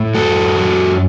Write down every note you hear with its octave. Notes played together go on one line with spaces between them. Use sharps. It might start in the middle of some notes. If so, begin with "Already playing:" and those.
Already playing: A2
F#2 F#4 A4
F#3